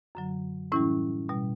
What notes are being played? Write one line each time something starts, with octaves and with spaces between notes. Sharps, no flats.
F#2 D3 F#3
A2 E3 G3 C#4 E4
B2 G3